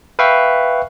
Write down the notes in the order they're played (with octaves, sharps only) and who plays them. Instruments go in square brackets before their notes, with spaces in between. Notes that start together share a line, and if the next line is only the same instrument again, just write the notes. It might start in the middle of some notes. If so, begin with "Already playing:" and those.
[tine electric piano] B4 E5 F5 G5 C#6